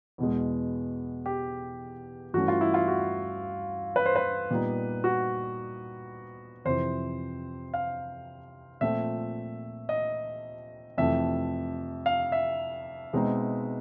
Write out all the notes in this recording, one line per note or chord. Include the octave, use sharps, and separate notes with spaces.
E2 B2 G#3
G4
G2 E3 A3 C#4 F#4
F4
E4
F4
F#4
B4
C5
B4
A#2 G3 B3 D#4
F#4
F2 C3 E3 C5
F5
A#2 F3 A3 C4 E5
D#5
F2 C3 E3 A3 E5
F5
E5
B2 G#3 C4 D#4